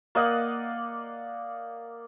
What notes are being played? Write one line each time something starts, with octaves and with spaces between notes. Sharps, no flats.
A#3 D5 D#5 F#5